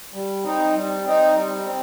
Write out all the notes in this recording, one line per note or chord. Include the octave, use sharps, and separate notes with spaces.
G3
C4 D#4
G3
C4 D#4
G3
C4